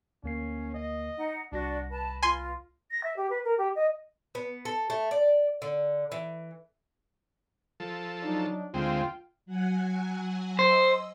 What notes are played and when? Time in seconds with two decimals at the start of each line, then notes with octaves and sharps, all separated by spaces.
0.24 D2 A#3 C#4 C7
0.74 D#5
1.17 D#4 F#5
1.52 C2 D4 F#4 D5 A#6
1.91 B4 A5
2.23 F4 G#5 C6
2.91 A#6
3.03 E5
3.16 G4
3.30 B4
3.44 A#4
3.58 G4
3.75 D#5
4.35 B3
4.65 A4
4.90 A3
5.11 D5
5.62 D3
6.12 E3
7.80 F3 A4
8.23 F#3 D4 D#4
8.74 D2 G#3 C4 F4 F5 G5
9.46 F#3 F#5 G#5
10.59 C5 D#5 E6